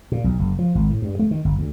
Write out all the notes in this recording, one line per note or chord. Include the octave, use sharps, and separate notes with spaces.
A#2
B1
F#1
F3
G#1
A2
G2
A3
D#3
G1
D2